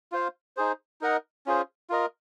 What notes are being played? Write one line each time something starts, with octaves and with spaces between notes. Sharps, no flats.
F4 C5 F5
D#4 G#4 C5
D#4 A#4 D#5 F#5
C#4 F4 G#4 C5
F4 A#4 D#5